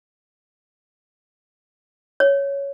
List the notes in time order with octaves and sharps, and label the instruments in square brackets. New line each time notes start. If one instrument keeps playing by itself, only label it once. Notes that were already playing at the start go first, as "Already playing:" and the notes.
[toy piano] C#5